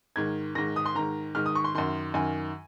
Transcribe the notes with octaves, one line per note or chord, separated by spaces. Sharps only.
G#2 D#3 G#6
G#2 D#3 A#6
D#6
C6
G#2 D#3 A#5
G#2 D#3 F6
D#6
C#6
C6
F#2 D#3 C6
F#2 D#3 G#5